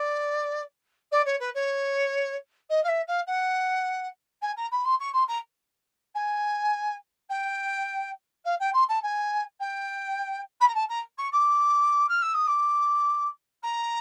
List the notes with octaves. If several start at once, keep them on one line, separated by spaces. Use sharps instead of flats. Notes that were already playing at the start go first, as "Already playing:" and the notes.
Already playing: D5
D5
C#5
B4
C#5
D#5
F5
E5
F5
F#5
G#5
A#5
B5
C6
C#6
C6
A#5
G#5
G5
F5
G5
C6
A5
G#5
G5
B5
A#5
A5
A#5
C#6
D6
F6
E6
D#6
D6
A#5